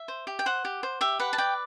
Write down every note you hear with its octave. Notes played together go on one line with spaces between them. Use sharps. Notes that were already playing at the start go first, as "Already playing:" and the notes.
Already playing: E5
C5
G4
G5
C5 F#5
G4
C5
G4 E5
B4 F#5
A5
D5 G5